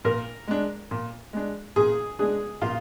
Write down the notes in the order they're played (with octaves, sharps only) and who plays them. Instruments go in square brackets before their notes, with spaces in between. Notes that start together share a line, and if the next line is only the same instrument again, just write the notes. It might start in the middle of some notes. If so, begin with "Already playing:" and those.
[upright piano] A#2 [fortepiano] A#4
[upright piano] G#3 D4
A#2
G#3 D4
[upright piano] A#2 [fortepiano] G#4
[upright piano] G#3 D4 [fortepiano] G#4
[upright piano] A#2 [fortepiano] F4